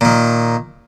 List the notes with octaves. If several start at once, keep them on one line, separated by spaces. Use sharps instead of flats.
A#2 D#3